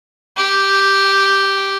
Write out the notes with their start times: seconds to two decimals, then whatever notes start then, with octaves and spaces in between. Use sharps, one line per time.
0.37 G4